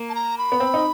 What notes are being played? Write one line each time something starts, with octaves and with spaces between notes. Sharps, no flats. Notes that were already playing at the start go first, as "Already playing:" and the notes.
Already playing: A#3
A5
A#5
B5
B3
C4
D#4